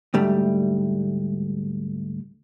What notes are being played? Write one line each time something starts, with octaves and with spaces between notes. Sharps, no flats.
D2 G#2 G3 A3